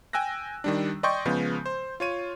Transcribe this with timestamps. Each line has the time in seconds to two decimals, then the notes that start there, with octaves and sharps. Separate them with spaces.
0.13 G5 G#5 E6 F#6 A#6
0.64 D#3 G3 D4
1.03 D5 D#5 G5 C6 C#6 G6
1.26 C#3 F3 G#3 B3
1.66 C5
2.00 F4 C#5 D#7